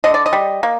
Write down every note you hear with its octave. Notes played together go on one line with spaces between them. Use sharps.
D3 D#5
D5
D#5
G3
A#3